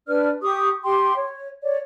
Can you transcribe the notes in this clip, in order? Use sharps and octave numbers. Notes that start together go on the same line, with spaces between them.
D4 B4 D5 F6
G4 C#6 D#6
G4 G5 C6
C#5
C#5 D5